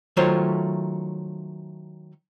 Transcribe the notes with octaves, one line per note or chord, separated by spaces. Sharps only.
D#3 F#3 A3 F4 C5 C#5